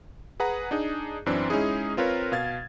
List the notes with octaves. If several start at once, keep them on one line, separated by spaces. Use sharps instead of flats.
G#4 B4 F#5 A#5
D4 D#4 G#4
F#2 E3 C4 D4
G#3 C#4 D#4 E4 G#4
C4 F4 A#4 B4 C#5
B2 F5 G#6 A6